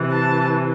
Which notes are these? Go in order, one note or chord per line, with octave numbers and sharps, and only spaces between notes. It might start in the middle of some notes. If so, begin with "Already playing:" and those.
Already playing: C3 E3
A5